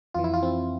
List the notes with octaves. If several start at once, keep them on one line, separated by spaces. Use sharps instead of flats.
F2 E3 F4
E4
F4
C4